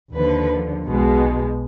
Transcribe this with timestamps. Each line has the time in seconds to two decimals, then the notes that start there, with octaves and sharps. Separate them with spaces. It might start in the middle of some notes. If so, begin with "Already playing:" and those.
0.14 D#2 D3 F3 B4
0.86 B1 B2 G#3